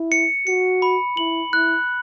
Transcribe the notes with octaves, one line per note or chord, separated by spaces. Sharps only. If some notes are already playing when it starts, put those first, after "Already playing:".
Already playing: E4
C#7
F#4 C#7
B5
E4 F#7
E4 F#6